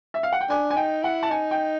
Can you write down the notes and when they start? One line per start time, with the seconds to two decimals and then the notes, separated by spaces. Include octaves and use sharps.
0.14 E5
0.23 F5
0.33 F#5
0.41 G5
0.49 D4 G#5
0.70 G#5
0.76 D#4 G5
1.03 E4 F#5
1.23 A5
1.30 D#4 G#5
1.51 G5